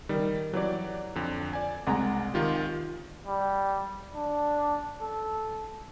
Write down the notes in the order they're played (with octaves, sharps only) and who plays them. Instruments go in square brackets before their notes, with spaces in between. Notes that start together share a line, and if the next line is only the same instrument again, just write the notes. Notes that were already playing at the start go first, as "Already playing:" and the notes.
[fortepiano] D#3 [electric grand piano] G3
[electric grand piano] E3 G4 D5 [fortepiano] F#3
[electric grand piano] F2 D3
D5 G#5
[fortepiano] C2 G#3 A#5 [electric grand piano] F#5
[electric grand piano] D#3 F4 G4
[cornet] G3
D4
A4